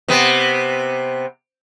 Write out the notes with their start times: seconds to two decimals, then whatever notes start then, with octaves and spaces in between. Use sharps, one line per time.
0.08 C3 B3